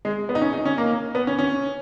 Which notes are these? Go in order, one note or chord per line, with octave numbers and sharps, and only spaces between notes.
G#3
B3
D#4
C#4
D#4
C#4
A#3
B3
C#4
C#4